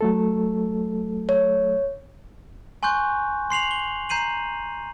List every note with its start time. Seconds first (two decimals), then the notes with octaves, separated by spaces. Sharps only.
0.01 F#3 A3 A4
1.29 C#5
2.83 G#5 C6 C#6 F#6 G6
3.50 C6 C7 F7 F#7
3.71 G7
4.09 A#5 G6 C7 D#7 F#7